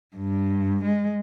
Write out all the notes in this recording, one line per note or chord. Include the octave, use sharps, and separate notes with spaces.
G2
G#3